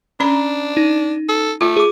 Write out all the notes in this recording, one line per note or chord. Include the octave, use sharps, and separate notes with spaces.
C#4 D4 A#5
D#4
A4
A3 F4
G#4 D6